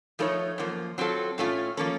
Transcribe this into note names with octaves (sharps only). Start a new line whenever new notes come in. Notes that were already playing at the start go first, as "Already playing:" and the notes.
F3 A3 D#4 A#4 C#5
F#2 F3 A#3
F#3 C4 F4 A4
A2 A3 C#4 F4
F3 A#3 C#4 A4